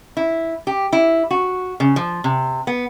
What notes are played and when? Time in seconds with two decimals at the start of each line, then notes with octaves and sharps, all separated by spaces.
0.17 E4
0.67 G4
0.93 E4
1.31 F#4
1.80 C#3
1.96 F3
2.24 C3
2.67 B3